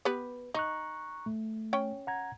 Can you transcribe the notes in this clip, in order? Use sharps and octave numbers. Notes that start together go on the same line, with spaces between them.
B3 G4 B4
D#4 A#5 C#6 F#6
A3
C#4 G5
F#5 A#5 G#6